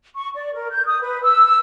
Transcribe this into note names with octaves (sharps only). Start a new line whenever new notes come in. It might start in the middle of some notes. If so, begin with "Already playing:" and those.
C#6
D5
A#4
G6
D#6
B4
E6